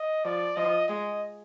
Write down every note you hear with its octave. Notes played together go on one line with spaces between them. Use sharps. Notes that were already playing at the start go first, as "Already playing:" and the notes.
Already playing: D#5
F3 D5
F3 D#5
G#3 D#5